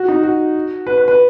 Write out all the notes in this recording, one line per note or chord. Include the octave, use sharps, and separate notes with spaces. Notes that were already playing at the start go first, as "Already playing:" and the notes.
Already playing: F#4
D#4
F#4
B4
B4
B4